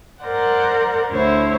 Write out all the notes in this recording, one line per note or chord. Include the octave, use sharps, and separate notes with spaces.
A#4 C5 D5 F#5
D2 D3 E4 C5 C#5